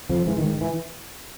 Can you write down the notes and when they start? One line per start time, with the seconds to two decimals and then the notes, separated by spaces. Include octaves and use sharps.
0.09 F2 F3
0.26 G#2 E3
0.38 D#3
0.44 G#2
0.49 D#3
0.61 E3